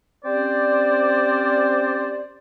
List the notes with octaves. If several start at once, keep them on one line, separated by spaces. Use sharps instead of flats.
C4 C#4 G4 C5 D5